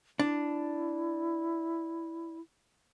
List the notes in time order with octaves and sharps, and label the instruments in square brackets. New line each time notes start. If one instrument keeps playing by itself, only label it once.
[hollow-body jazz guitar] D4 [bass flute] E4